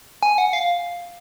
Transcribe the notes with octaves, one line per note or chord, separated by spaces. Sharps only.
G#5
F#5
F5